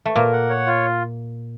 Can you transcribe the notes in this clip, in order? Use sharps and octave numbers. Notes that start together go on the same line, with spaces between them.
A3
A#2 A#3 A#4
F#5
C#5
F4